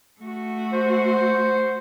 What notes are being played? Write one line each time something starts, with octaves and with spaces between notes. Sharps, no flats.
A3 F#4
C5